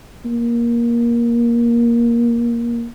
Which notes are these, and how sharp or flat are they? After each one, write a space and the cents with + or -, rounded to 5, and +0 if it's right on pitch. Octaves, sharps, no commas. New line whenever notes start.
A#3 +15